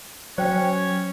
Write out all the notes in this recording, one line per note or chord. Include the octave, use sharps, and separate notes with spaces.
F#3 C#4 C5 C#5 G5